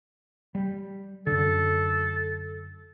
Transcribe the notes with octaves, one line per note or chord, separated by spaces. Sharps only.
G3
F#2 D3 A4